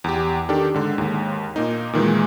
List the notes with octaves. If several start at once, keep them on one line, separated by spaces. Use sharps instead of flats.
E2 G4
D#3 D4 G4 A4
G#2 D3
D#2 G#2
A#2 A#3 D#4
A#2 D#3 E3 G#3